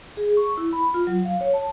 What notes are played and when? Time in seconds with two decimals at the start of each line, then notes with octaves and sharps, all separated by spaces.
0.17 G#4
0.37 C#6
0.57 E4
0.73 B5
0.94 F4
1.07 F#3
1.25 F5
1.41 C#5
1.53 A5